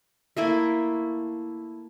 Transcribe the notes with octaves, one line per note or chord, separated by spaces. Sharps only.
A3 A#3 E4